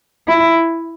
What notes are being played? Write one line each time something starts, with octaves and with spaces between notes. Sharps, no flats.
E4